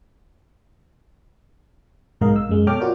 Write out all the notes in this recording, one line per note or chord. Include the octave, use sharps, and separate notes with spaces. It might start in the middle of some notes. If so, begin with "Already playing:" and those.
B1 G#2 G#3 A#4 D#5 F5
E6
F#2 G#3
B2 A4 C#5 G5 D6 F6
F4 F#4 A#4 D5